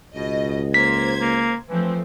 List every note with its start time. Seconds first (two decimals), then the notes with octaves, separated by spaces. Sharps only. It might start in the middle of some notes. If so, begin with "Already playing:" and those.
0.15 C#2 B2 D#5
0.74 A#3 C5 G#6 B6
1.19 A#3
1.69 E3 F3 A3 C4